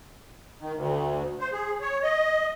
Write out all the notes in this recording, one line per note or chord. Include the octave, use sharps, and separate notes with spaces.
D#3
D2
C5
G#4
C#5
D#5